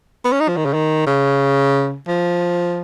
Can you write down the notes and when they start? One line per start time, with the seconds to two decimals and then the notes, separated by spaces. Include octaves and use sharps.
0.25 B3
0.32 C#4
0.40 D#4
0.48 F3
0.57 D#3
0.65 C#3
0.73 D#3
1.06 C#3
2.08 F3